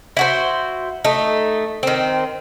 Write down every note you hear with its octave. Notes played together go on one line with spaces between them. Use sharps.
E4 F#4 C5
A3 D#4
D#3 C4